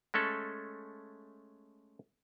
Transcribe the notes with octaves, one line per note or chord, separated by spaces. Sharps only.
G#3 A3 C#4 A4